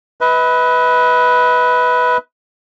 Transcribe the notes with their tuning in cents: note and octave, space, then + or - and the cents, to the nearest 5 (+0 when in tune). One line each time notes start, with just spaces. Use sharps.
B4 +0 D#5 +45